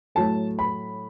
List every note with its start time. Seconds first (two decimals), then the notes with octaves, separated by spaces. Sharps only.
0.15 A2 F#3 A3 A5
0.59 B5